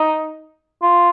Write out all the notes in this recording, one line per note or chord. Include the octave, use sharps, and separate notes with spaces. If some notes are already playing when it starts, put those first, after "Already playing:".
Already playing: D#4
F4